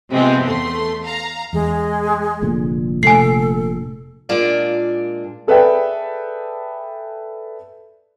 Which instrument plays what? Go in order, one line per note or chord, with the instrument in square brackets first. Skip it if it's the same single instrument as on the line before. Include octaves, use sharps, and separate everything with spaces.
[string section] C3 G#3 B3 C4 F4
E2 A3 C6
F5 A#5
[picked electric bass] E2 [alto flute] G#3
[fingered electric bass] F1 A#2 D3
[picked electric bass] C3 A3 [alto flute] A4 [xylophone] G#5 C7
[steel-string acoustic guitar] A#2 G#3 A#3 D4 F4 D5
[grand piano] G#4 A4 B4 D5 E5 G5